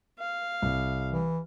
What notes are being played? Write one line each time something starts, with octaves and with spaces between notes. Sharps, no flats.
F5
C2
E3